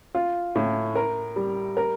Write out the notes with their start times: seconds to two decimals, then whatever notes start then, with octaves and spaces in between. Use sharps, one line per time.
0.15 F4
0.55 A2
0.95 A#4
1.36 G3
1.77 A#4